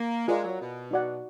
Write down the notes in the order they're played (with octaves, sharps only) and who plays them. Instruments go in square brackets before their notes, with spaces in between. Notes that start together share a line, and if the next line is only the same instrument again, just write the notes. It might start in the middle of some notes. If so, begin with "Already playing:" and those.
Already playing: [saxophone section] A#3
[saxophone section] G#3 [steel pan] F4 A#4 D5 F5
[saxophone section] F#3
B2
[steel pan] D#4 F#4 D5 F#5